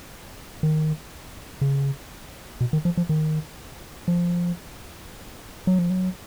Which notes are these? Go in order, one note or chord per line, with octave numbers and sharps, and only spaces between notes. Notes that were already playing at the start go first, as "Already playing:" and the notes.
D#3
C#3
B2
D#3
F3
F3
D#3
F3
F#3
F3
F#3